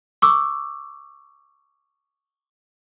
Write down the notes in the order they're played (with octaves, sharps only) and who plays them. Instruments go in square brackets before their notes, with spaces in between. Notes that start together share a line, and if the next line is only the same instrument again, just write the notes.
[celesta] C#6 D6 E6